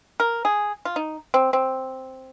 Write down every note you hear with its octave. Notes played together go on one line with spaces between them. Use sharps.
A#4
G#4
F4
D#4
C4
C4